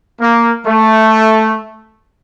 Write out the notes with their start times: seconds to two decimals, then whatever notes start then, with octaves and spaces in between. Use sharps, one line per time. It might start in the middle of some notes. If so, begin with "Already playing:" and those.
0.21 A#3
0.66 A3